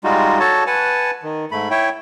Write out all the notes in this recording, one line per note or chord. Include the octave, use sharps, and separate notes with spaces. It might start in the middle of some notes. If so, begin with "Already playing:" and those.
G3 G#3 D#4 F4 F#4
F#4 A4 C#5 A5
B4 F#5 G#5 A5
D#3
G#2 A3 B5
E4 C#5 E5 G5